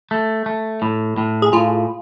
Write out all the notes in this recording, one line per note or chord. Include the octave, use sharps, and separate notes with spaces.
A3
A3
A2
A2
G#4
A2 F4